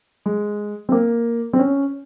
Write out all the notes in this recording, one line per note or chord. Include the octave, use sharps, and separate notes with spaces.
G#3
C4
A#3
C4
C#4